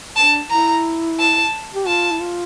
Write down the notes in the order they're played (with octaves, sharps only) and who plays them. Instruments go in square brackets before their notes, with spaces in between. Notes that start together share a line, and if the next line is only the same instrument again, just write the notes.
[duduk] D4 [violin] A5
[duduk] E4 [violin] A#5
[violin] A5
[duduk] G4
[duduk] F4 [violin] A5
[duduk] E4
F4